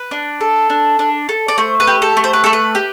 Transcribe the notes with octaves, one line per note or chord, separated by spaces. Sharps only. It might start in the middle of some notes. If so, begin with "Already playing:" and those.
Already playing: B4
D4
A4
D4
D4
A4
D5
A3 C5
B4
G4
A4
A3
C5
B4
A3 A4
B4
G4